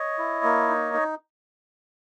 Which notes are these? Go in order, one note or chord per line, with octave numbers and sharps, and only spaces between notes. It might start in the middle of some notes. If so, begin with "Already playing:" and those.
Already playing: C#5 D#5
E4
A#3
D#4
D#4